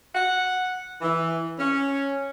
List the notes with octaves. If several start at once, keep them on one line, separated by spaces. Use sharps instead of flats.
F#5
E3
C#4